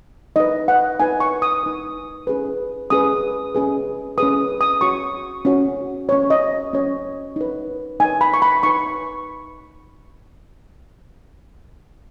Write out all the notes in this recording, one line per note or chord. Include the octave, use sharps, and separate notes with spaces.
D#4 B4 D#5
F#5
D#4 B4 G#5
C#6
D#6
D#4 B4
C#4 G#4 B4
C#4 G#4 B4 D#6
C#4 G#4 B4
C#4 G#4 B4 D#6
D#6
C#4 F#4 C#5 C#6
C#4 F#4 C#5
C#4 F#4 C#5
D#5
C#4 F#4 C#5
D#4 B4
D#4 B4 G#5
B5
C#6
B5
D#4 B4 C#6